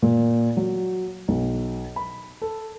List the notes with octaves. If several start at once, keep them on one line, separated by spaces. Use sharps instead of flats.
A#2
F#3
B1
B5
A4